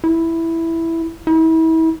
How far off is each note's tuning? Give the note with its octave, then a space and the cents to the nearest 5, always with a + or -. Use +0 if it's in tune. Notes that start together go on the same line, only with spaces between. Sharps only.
E4 +0
E4 -35